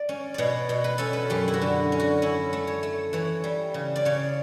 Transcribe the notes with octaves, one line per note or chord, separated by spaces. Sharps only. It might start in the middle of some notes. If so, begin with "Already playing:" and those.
Already playing: D5
C#4
B2 C#5 D5
B2
B4
C#4 A4
B4
F#2 G4
E4
F#4
D3
C#4
F#4
C#4 E4
A3
C#5
A3
E3 C#5
G3
C#3
D5
C#3 C#5